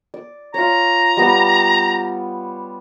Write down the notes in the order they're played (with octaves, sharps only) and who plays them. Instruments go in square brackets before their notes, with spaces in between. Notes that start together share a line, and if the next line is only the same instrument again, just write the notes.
[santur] D5
[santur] F4 C#5 [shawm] A#5
[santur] G3 B3 G4